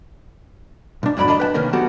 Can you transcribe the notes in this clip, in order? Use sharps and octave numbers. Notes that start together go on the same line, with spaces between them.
B1 D4
F2 A2 F#3 D5 A#5 B5
D2 D4 D#5 A#5
B4 G5 A5
C3 D#3 A#3 C#4 A#4
F#3 A3 B3 F#4 G4